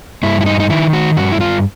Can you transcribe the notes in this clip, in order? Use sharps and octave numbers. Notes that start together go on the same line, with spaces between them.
G2 E4
E4
D#4
D#4
D#3 E4
F#4
G2 F#4
E4
F4